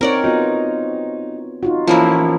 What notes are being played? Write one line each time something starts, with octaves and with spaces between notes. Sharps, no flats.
C4 D#4 A#4 C#5 D5 F#5
B3 D#4 F4 F#4
D#4 F4 F#4
E3 F3 A#3 C#4 E4 C#5